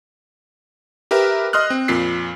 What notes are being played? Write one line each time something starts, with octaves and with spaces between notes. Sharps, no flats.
G4 A#4 B4 E5
D#5 C6 D#6 F6 F#6
C4
F2 A#2 B6 C7